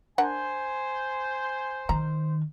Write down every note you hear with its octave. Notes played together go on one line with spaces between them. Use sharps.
D4 A#4 C5 F#5 G#5
D#3 A#5